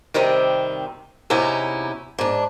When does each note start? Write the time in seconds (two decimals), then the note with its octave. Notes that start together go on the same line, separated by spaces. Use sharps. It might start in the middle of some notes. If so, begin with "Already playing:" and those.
0.14 C3 D#3 G3 C4
1.30 E2 C3 C#4 D#4 E4
2.19 G#2 D4